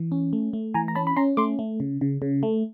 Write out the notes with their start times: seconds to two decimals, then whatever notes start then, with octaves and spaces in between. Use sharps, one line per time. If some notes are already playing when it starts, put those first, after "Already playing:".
Already playing: E3
0.12 C#4
0.33 A3
0.53 A3
0.74 E3 G#5 A#5
0.88 A#5
0.95 C#4 A5 B5
1.07 B5
1.17 C#4 A#5 C6
1.37 A3 C6 D6
1.59 A3
1.80 C#3
2.01 C#3
2.22 C#3
2.43 A3